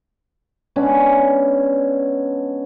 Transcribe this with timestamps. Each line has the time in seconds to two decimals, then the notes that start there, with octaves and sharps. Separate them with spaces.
0.76 G#3 B3 C#4 D4